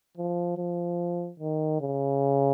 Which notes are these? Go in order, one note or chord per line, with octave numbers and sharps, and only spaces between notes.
F3
F3
D#3
C#3